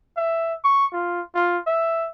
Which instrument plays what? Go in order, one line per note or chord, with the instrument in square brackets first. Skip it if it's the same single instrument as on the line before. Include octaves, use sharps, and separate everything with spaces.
[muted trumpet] E5
C#6
F4
F4
E5